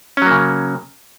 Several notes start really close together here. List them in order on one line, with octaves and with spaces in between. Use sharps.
C#4 F#3 A#3 C#3